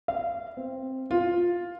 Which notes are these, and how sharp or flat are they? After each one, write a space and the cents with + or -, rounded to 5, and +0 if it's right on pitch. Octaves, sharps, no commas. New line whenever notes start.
F5 -25
C4 +5
F4 +5